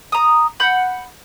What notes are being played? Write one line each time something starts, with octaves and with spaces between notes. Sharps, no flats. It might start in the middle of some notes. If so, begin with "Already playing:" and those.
A#5 D#6
F#5 B5 G6